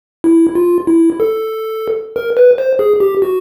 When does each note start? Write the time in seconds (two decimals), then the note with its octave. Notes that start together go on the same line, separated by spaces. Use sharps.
0.24 E4
0.55 F4
0.87 E4
1.20 A4
2.16 A#4
2.37 B4
2.58 C5
2.79 G#4
3.00 G4
3.22 F#4